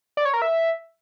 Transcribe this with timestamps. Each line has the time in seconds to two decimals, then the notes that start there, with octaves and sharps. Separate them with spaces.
0.17 D5
0.25 C#5
0.34 A#4
0.42 E5